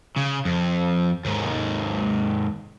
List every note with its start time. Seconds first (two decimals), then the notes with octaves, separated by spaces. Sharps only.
0.16 C#3
0.45 F2
1.25 D#2 G#2